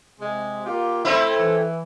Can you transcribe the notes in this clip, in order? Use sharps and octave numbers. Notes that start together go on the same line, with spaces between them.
C3 G#3
A#3 F4 G4
A3 C4 E4 C5 E5 B5
E3